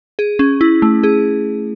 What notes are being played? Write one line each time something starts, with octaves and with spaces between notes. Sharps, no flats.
G#4
C#4
E4
A3
G#4